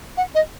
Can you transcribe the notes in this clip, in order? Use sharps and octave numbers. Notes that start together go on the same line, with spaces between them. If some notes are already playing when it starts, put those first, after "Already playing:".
F#5
D#5